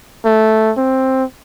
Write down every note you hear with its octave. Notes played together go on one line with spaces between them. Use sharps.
A3
C4